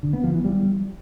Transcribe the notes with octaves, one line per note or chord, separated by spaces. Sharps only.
D3
B3
F3
E3
G3